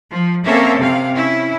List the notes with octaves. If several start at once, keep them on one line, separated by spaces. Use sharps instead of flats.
F3
A#3 C4 C#4 A4 E5
C3 F5
C#4 E4